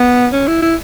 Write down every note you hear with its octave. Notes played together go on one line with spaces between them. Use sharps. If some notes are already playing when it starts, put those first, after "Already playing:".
Already playing: B3
C#4
E4
E4